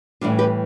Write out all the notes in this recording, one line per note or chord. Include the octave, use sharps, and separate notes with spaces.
A2 E3 G3 D4 F4
G4 B4